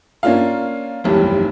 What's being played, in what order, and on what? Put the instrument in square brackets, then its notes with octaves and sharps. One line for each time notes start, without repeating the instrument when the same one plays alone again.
[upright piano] A#3 C#4 D4 F4 F5
F1 B1 G2 C3 E3